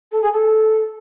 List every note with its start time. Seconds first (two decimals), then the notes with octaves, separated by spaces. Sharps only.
0.11 A4
0.22 G#4
0.32 A4